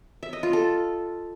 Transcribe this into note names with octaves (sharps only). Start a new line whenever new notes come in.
E5
D#5
F4
A4